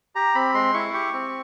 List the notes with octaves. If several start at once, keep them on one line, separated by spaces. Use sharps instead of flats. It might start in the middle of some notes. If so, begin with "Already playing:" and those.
G4 A#5
C4 B5
G#3 C6
E4 C#6
G4 C#6
C4